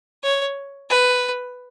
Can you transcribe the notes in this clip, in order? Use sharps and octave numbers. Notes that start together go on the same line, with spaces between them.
C#5
B4